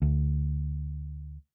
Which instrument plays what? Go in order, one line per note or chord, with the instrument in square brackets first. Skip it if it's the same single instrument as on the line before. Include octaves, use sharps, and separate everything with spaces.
[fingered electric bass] D2